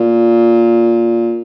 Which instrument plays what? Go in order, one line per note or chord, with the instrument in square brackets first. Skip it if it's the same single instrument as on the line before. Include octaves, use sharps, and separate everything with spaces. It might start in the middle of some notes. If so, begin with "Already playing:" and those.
Already playing: [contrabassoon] A#2